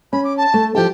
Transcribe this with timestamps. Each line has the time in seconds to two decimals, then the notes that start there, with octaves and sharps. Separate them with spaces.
0.13 C#4 B5
0.24 D6
0.37 A5
0.54 A3
0.75 F3 E4 G4 A4